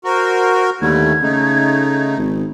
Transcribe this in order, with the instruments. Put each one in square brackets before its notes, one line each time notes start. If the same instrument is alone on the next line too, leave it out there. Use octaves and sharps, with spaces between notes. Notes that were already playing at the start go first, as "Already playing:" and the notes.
[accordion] F#4 A#4 [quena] C5
[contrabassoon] D#2 [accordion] D3 G3 A3 [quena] G#6
[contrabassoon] C#3 [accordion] A3 D#4
[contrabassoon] G#1